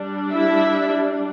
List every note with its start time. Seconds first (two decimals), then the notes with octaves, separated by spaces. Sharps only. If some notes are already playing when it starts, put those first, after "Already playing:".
Already playing: G3 D4
0.32 E4 E5